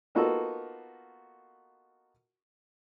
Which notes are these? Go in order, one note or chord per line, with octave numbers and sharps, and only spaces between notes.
A#3 B3 D#4 F4 F#4 A4